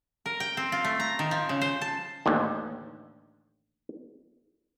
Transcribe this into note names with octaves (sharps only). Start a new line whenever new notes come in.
A#4
G5
C4
F4
A3
A#5
D#3
F3
C#3
C5
A5
A1 D#2 D3